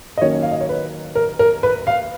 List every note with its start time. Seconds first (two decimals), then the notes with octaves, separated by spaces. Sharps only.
0.18 D#5
0.21 D#3 F#3 A#3 C#4 C#5
0.42 F5
0.51 D#5
0.61 C#5
0.69 B4
1.15 A#4
1.39 A#4
1.63 B4
1.87 F5